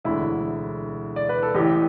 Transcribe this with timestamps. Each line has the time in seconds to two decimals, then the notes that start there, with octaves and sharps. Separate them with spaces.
0.04 E1 D2 D3 E4
1.16 D5
1.29 B4
1.43 A4
1.55 A1 A2 E3 G4